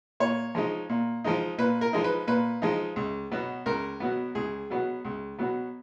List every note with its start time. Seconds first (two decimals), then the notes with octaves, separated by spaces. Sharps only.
0.20 A#2 C#5
0.55 F3 G#3 D#4
0.89 A#2
1.24 F3 G#3 D#4
1.58 A#2 B4
1.81 A#4
1.93 F3 G#3 D#4
2.04 B4
2.27 A#2 B4
2.62 F3 G#3 D#4
2.96 C#2
3.31 B2 F#3 B3
3.66 C#2 A#4
4.00 B2 F#3 B3
4.35 C#2 G#4
4.70 B2 F#3 B3
5.05 C#2
5.39 B2 F#3 B3